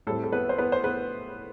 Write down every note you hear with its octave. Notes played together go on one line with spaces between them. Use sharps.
A2 G3 C4 A4
A4
B3 B4
C5
B3 B4
C5
B3 B4